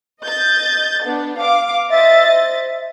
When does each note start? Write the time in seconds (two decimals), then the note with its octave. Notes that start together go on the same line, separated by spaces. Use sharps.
0.22 D#5 G6 A6
1.03 B3 D4
1.40 F5 D6
1.90 C5 D#5 E5 A6
2.27 E5